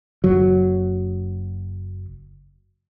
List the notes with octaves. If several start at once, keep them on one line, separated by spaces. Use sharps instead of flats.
F#1 F#3